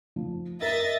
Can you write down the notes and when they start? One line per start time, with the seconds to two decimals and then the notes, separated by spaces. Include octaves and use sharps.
0.16 F3
0.62 A#4 D#5 E5 A6